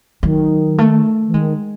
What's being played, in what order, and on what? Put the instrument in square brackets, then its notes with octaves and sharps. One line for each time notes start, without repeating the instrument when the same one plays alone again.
[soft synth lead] D#3 [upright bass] F#3
[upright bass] A3
[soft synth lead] E3
[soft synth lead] D#3 [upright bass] G#3